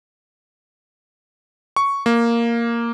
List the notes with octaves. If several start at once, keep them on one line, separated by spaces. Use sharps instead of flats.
C#6
A#3